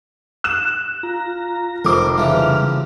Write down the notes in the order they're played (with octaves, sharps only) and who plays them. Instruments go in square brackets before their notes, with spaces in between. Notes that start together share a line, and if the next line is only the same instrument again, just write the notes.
[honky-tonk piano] F#6 E7
[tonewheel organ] F4 A#5
[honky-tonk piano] F1 D6 [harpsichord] A#4 C5
[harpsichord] C#3 E3 F3 [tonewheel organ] G3 F6